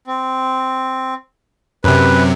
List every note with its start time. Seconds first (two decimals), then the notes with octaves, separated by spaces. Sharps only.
0.07 C4
1.84 F#2 C3 B4